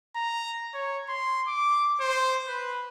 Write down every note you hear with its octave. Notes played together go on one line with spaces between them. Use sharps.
A#5
C#5
C6
D6
C5
B4